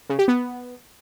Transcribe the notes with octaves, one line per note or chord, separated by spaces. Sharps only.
C#3
G4
B3